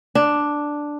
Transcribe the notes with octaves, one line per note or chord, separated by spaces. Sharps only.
D4